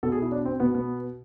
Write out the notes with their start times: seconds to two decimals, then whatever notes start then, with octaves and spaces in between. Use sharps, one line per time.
0.03 B2 A4
0.12 G#4
0.22 E4
0.32 D4
0.45 C4
0.60 B2 B3
0.74 B3